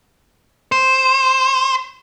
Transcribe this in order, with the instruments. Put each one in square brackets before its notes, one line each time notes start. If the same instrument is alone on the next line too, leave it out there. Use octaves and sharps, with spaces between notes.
[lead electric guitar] C5